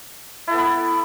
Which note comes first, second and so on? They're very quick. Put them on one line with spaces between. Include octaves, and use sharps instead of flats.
E4 A4 B3